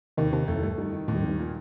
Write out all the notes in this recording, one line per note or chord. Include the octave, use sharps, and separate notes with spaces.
D#2 C3 D#3
D#2 C3 D#3
F2 A3
A2
G2 A3
G2 D#3
D#3
D#2 A2
G2
F2 D#3
G2
A#2